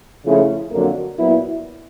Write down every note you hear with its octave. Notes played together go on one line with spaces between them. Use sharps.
C#3 F3 A3 C#4 E4
F2 D3 F#3 A#3
A#2 F#3 B3 E4